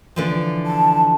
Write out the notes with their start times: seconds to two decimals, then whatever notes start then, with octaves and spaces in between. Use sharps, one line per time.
0.16 D3 E3 F3
0.66 A5